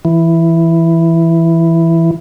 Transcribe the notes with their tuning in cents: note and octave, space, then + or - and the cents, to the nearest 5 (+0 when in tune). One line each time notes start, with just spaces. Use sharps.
E3 +5